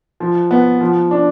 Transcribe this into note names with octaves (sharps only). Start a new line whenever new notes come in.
F3
B3
F3
D4